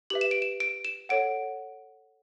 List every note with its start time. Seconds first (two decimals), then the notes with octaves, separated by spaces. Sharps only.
0.10 G4 B4 E5 F#7
0.21 E7
0.31 D7
0.42 E7
0.60 D7
0.85 E7
1.09 A4 C#5 F#5 D7